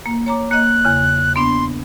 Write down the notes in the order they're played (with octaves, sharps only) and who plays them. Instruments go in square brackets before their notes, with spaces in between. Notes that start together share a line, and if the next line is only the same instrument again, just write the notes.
[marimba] A#3
C#5 A#5 D6
[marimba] A#3 D#5 [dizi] F#6
[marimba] E2 C#3
[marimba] B3 D4 [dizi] C6